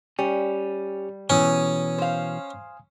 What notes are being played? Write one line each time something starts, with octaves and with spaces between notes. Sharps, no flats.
G3 C#4 G4
B2 E3 C#4 G#5 D#6
C5 F5